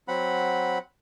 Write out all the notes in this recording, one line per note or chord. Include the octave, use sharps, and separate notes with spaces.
F#3 C4 F#5 B5